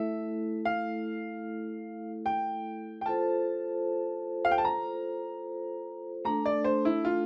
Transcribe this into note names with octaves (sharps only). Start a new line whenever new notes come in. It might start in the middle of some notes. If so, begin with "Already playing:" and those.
Already playing: A3 E4 A4 E5
F5
G5
G5
F4 A4 C5 A5
F5
G5
A5
A#5
A3 D4 A4 A#5
D5
C5
E4
F4